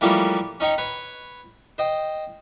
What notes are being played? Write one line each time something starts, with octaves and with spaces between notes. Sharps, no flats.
E3 F3 G3 A3 A#3 C#4
C#4 D#4 G5 C#6
B4 C#5
C5 D#5 G5